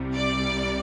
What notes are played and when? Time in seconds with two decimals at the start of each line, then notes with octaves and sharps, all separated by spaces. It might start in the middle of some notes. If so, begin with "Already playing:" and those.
Already playing: C2 C3 G3
0.16 D5